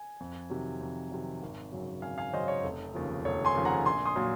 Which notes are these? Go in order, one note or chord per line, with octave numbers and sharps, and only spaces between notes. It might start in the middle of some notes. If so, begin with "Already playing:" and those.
Already playing: G#5
F2
C3 D#3 F#3
F2
C3 D#3 F#3
G#1
F#2 C#3 F#3
G#1 F5 G#5
F5 G#5
F#2 C#3 F#3 C5 D#5
C#5
F1
D#2 C#3 F3
F1 C#5
G#5 C6
D#2 C#3 F3
F#5 A#5
A#1 G#5 C6
C6 D#6
A#2 F#3